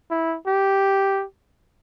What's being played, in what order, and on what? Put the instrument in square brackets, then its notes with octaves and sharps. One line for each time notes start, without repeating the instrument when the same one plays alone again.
[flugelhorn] E4
G4